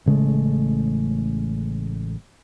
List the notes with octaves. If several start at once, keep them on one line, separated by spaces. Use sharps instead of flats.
A1 C#3 G#3 A3